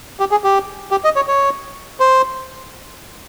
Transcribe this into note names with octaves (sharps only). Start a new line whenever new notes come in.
G4
G#4
G4
G4
D#5
C#5
C#5
C5